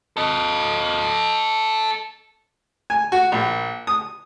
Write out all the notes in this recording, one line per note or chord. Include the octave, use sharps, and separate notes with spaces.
A4 D#5
G#5
F#4
A#1
D#6